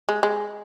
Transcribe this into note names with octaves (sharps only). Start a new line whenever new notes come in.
G#3
G#3